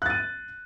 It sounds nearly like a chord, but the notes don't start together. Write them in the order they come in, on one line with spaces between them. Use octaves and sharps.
F#6 A6 D#7